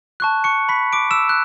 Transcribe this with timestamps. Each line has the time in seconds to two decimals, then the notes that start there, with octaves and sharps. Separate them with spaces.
0.20 A5 C#6 F#6
0.44 C#6 C#7
0.69 B5 B6
0.93 D6 D7
1.11 E6 E7
1.29 F#6